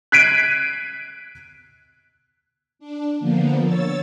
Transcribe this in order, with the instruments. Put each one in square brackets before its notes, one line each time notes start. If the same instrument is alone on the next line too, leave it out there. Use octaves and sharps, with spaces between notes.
[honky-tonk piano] F#6 G#6 B6 C7 D7 D#7
[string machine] D4
D3 F3 A#3 B3
C#5 E6 A6